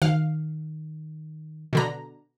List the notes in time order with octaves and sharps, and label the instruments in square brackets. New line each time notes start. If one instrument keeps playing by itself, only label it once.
[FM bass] D#3 [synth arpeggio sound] F5
[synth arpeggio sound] B2 D3 A#5